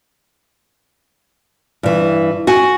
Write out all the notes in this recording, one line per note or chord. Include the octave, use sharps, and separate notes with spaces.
G2 E3
F#4 G#5